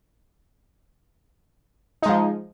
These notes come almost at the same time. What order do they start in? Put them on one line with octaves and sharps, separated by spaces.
D#4 G#3 F3